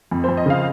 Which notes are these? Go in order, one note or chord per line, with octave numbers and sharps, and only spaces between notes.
F2
C5
F2
D#5
C#3 F5